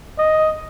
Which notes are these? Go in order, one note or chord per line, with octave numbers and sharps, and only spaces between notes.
D#5